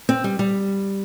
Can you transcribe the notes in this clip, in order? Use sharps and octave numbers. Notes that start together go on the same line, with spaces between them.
C4
G3
G3